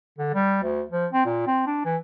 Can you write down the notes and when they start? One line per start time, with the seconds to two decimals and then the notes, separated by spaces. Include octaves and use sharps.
0.18 D3
0.34 G3
0.63 D2
0.90 F3
1.13 C4
1.25 A#2
1.47 C4
1.66 D4
1.85 E3